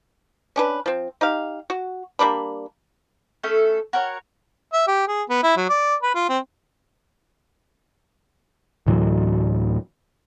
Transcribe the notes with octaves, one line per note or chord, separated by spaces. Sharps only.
C#4 D4 B4
F3 C4
D#4 G4 F5
F#4
G3 A#3 D4 B5
A3 C#4 A4
F#4 A#4 C#5
E5
G4
G#4
B3
E4
F#3
D5
B4
F4
C4
D2 A2 E3 F#3